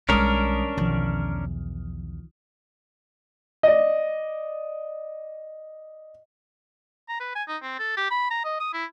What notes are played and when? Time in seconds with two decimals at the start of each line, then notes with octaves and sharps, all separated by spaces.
0.09 B1 D#3 G3 G#3 C#4 D4 A#4 D#6
0.77 B1 E2 D#3 F3
3.63 D5 D#5
7.09 A#5
7.20 B4
7.35 G#5
7.48 D#4
7.62 C4
7.79 A4
7.97 G4
8.11 B5
8.30 A#5
8.44 D#5
8.60 D#6
8.73 E4